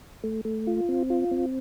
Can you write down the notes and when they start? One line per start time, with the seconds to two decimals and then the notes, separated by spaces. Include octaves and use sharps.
0.24 A3
0.45 A3
0.67 F4
0.89 C4
1.10 F4
1.31 C4